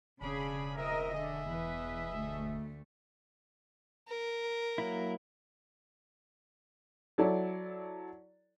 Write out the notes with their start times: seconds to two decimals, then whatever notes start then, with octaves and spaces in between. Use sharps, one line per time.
0.21 E1 C#3 D4 G#4 D5 B5
0.76 A#2 C4 A#4 D#5 E5
1.15 D3 G#4 D#5 E5
1.48 E2 B4
2.14 D2 A3
4.08 A#4
4.78 F#3 A#3 E4
7.18 F#3 E4 A4 C#5 D5